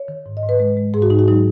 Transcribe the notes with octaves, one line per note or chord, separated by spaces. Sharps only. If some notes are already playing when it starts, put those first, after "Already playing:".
Already playing: C#5
D#3
G#2
D#5
G#2
B4
G#3
G#3
G#2 G#4
F#4
G#2 D#4
F#4
F#3 D#4